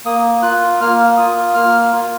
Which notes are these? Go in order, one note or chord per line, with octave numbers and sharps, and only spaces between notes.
A#3 D#6
F4 F#6
A#3 F6
F4 D#6
A#3 F6
F4